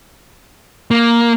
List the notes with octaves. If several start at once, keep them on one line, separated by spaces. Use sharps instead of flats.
A#3